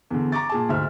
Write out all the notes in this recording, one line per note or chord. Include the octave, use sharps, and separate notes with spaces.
E2 D3
A#5 C#6 D6 A6
A#2 G#4 A5
D2 G#2 E5 F6